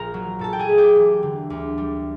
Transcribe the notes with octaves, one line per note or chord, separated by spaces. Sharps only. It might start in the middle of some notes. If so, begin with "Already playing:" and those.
Already playing: A#1 A#4 A#5
F#3
A#2 A4 A5
G5
G#4 G#5
A3
G4 G5
E1
D3
D2
G3